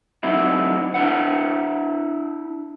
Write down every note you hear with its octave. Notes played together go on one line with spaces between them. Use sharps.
D3 F#3 C4 D#4 E4
D4 E4 B4 F#5